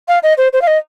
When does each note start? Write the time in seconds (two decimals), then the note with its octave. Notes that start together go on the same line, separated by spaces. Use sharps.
0.08 F5
0.23 D#5
0.37 C5
0.53 C5
0.61 F5
0.67 D#5